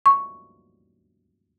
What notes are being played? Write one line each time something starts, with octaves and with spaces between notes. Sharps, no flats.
C#6